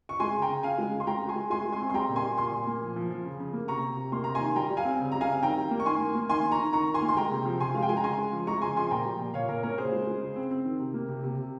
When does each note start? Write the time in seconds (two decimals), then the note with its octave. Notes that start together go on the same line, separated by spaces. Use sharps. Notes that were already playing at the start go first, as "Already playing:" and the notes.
0.09 C#6
0.20 G#3 G#5 C6
0.35 C#3
0.42 G5 A#5
0.49 C#3
0.63 C#3 F5 G#5
0.78 G#3
0.93 C#3
1.00 C6
1.07 G#3 G5 A#5
1.21 G#3
1.29 G#5 C6
1.36 G#3
1.50 G#3 G#5 C6
1.65 G#3
1.72 G#5 C6
1.80 C4
1.90 C6
1.94 G3 G5 A#5
2.09 A#2
2.16 G#5 C6
2.23 G3
2.38 A#2 G#5 C6
2.52 A#2
2.67 A#3
2.81 F3
2.96 F3
3.10 F3
3.25 C#3
3.40 C#3
3.53 A#3
3.68 C3 A#5 C#6
3.83 C3
3.97 C3
4.12 A#3 C6
4.24 C3 A#5
4.35 G#5 C6
4.41 D#3
4.56 G3 G5 A#5
4.70 G3
4.77 F5 G#5
4.85 C4
4.99 C#3
5.12 G3 A#5
5.21 F5 G#5
5.28 C4
5.43 D#3 G5 A#5
5.57 G3
5.71 A#3
5.80 C#6
5.86 D#3 G#5 C6
6.01 A#3
6.15 A#3
6.29 D#3 G#5 C6
6.45 D#3
6.51 A#5 C#6
6.59 D#3
6.73 D#3 A#5 C#6
6.88 D#3
6.94 G#5 C6
7.02 A#3
7.08 C6
7.17 G#3 G5 A#5
7.31 C3
7.45 F3
7.60 C3 G#5 C6
7.74 G#3 F5
7.82 G5
7.89 G#3 G#5
7.97 A#5
8.04 C#3 G#5 C6
8.18 G#3
8.33 F3
8.47 G#3 A#5 C#6
8.61 C#3 G#5 C6
8.76 F3 G#5 C6
8.91 A#2 G5 A#5
9.05 G3
9.20 A#2
9.34 A#2 C#5 F5
9.49 A#2 A#4
9.63 A#3 A#4 C#5
9.78 C#3 G#4 C5
9.92 G#3
10.07 G#3
10.22 C#3
10.36 C4
10.51 C4
10.65 D#3
10.80 C3
10.94 A#3
11.08 C3
11.24 C3
11.38 C3